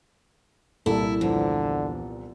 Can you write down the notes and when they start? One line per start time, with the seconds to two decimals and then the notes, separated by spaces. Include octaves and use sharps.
0.86 C2 A#2 E4 A4
1.21 E2 D3 F3